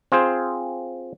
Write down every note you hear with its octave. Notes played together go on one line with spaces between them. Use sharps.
C4 F4 G#4 C5